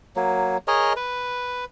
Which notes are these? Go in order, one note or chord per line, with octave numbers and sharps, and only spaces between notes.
F#3 A#3
G#4 A#4 C#5 D#5
B4